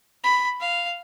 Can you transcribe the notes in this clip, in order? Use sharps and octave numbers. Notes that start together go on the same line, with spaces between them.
B5
F5